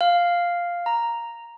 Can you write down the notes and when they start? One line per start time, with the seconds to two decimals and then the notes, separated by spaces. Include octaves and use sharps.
0.01 F5
0.86 A#5